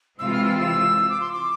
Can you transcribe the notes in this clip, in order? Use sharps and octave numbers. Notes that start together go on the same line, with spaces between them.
C3 E3 G#3 C4 F4 E6
F6
E6
E6
E6
D6
C6
D6